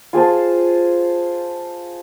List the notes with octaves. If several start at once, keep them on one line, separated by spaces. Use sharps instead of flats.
F4 G#4 C5 A5